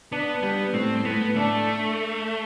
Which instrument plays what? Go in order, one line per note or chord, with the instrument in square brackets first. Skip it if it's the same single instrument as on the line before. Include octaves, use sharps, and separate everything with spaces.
[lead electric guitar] B3 [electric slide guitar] D4
[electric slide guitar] G3 [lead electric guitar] B3
[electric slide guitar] A2 [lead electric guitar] C4
[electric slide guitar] A2 [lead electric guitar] B3
[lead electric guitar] A3 [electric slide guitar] D4